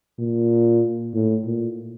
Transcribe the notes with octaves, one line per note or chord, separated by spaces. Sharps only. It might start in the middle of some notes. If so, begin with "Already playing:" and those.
A#2
A2
A#2